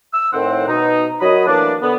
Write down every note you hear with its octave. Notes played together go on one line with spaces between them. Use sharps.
E6
A2 D#3 C4 F#5
B2 D#4
F#2 F#3 D#5 B5
E3 F#3 A3 A#3 D4
D3 B3